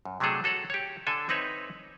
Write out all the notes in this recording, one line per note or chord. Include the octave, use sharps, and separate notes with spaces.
F#2
C3 F#3 A3 D4 G#4 A4
F#4 A4 C#5 F#5
G4 C#5
D3 D4 A4 G#5
C4 D#4 B4 C#5 E5